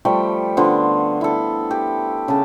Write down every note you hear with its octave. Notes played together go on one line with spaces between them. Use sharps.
F3 G3 A3 G5
D3 B3 F4 C5
E4 A4
G4
C#3 A5